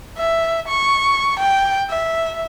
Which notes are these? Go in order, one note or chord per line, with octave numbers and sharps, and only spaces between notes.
E5
C#6
G5
E5